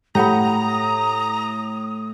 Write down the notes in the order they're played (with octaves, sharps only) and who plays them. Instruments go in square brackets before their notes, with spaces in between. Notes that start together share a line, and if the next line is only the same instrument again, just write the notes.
[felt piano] A2 [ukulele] G4 F#5 B5 [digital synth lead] A#5 [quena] D#6